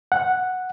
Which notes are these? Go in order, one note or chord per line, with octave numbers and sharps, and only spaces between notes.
F#5